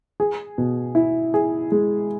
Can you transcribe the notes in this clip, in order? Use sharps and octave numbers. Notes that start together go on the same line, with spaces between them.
G#4
B2
E4
G#4
G#3